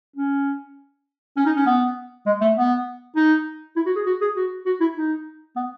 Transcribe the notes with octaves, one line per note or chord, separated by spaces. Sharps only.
C#4
C#4
D#4
C#4
B3
G#3
A3
B3
D#4
E4
F#4
G#4
F#4
G#4
F#4
F#4
E4
D#4
B3